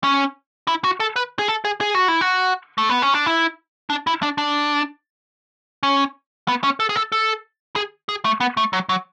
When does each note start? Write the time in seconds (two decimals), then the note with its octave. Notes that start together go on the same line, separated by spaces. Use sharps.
0.04 C#4
0.68 E4
0.84 F#4
1.00 A4
1.16 B4
1.39 G#4
1.48 A4
1.65 G#4
1.81 G#4
1.95 F#4
2.08 E4
2.21 F#4
2.78 A3
2.89 B3
3.02 C#4
3.14 D4
3.26 E4
3.90 D4
4.07 E4
4.23 D4
4.38 D4
5.83 C#4
6.48 B3
6.64 C#4
6.80 A4
6.89 G#4
6.96 A4
7.12 A4
7.76 G#4
8.09 G#4
8.25 A3
8.40 B3
8.57 A3
8.73 F#3
8.89 F#3